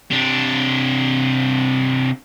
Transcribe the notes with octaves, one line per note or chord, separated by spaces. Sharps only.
C3 D4